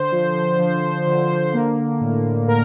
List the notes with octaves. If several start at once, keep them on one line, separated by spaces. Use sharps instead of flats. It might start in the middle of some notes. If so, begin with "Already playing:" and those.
Already playing: D3 C5
F3
F3
D3
A#3
A2
A2 A#4